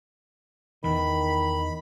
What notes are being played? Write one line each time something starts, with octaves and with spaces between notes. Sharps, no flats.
E2 D#3 E3 B5